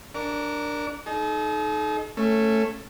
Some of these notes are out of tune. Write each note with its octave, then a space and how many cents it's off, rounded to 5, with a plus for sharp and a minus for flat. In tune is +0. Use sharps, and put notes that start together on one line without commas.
D4 +0 A#4 +0 D6 -45
D#4 +0 A4 -45
A3 +10 C#4 -10